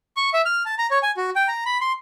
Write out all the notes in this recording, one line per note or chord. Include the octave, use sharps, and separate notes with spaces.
C#6
E5
F6
A5
A#5
C#5
G#5
F#4
G5
A#5
B5
C6